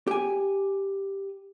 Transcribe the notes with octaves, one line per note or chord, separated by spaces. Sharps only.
G4 G#5